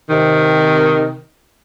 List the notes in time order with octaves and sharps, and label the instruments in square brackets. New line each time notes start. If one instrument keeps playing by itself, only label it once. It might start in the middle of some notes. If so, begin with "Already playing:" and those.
[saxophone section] C3 D#3